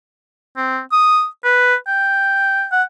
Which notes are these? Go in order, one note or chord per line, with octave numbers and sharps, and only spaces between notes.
C4
D#6
B4
G5
F#5